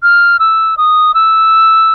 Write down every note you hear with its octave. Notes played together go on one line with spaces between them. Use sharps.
F6
E6
D#6
E6